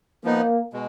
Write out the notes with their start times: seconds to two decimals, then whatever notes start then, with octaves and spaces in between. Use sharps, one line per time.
0.24 F3 A#3 B3 D#4
0.73 B2 G#3